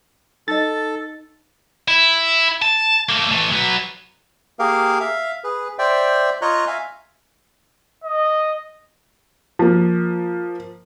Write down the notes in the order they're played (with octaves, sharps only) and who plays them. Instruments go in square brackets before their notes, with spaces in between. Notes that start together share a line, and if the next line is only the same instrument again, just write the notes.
[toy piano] D#4 D#5 [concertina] A4 [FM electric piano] A6
[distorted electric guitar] E4
A5
A3 A#3
E3 A3
F#3 B4
[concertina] A#3 G4 G#4 A#4 F5
E5 F5
G#4 B4
C5 D5 E5 G5
F4 C#5 D#5 A#5 C#6 F#6
E5 F5 G#5
[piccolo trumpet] D#5
[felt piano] F3 A#3